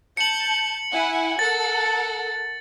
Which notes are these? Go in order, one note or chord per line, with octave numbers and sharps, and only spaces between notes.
A5 G6 C#7 F#7
E4 F#5 G#5
A4 A#4 F#5 A6